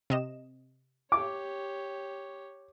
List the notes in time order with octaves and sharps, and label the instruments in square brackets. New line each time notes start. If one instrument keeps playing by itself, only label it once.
[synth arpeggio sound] C3 D#5 E7
[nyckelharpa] G4 C#5 [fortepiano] D6